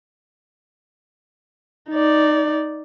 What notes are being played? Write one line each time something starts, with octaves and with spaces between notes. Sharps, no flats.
D#4 D5